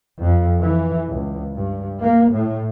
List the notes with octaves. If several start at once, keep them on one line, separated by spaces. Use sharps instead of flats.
F2
E3
C#2
G2
A#3
A2